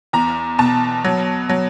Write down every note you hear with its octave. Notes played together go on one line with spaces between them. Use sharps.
E2 A#5
B2 A5
F#3
F#3